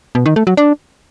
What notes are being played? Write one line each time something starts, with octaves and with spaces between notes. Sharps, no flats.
B2
D#3
A3
F#3
D4